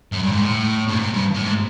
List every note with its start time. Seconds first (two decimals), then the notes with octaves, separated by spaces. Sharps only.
0.12 F#2
0.23 G2
0.32 G#2
0.42 A2
0.88 G2
0.99 G#2
1.13 G2
1.35 A2
1.42 G#2